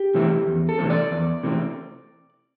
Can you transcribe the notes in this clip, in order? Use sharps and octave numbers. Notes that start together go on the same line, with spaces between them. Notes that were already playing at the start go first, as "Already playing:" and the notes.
Already playing: G4
C3 E3 A3 C4
E2
A4
C3 E3 A3 C4
D5
E2
C3 E3 A3 C4